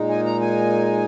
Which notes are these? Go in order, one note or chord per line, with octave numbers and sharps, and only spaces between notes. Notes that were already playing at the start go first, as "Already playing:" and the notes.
Already playing: A#2 G#3 D#4
G#5
A#5
G#5